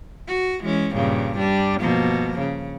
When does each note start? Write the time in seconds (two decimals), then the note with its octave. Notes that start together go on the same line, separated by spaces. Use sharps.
0.28 F#4
0.61 E3 G#3 C#4
0.94 G2 A#2 C#3
1.37 G3 D4
1.81 B2 F3 A#3
2.38 C#3